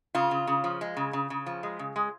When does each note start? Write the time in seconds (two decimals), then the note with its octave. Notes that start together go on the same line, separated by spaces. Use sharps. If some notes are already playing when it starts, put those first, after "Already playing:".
0.15 C#3 F4
0.31 C#3
0.47 C#3
0.64 F3
0.81 G#3
0.97 C#3
1.13 C#3
1.30 C#3
1.47 F3
1.63 G#3
1.79 C#3
1.96 G#3